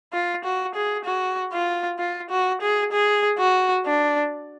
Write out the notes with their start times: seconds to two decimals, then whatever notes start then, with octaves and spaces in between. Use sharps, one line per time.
0.13 F4
0.44 F#4
0.75 G#4
1.05 F#4
1.53 F4
1.99 F4
2.30 F#4
2.62 G#4
2.92 G#4
3.39 F#4
3.86 D4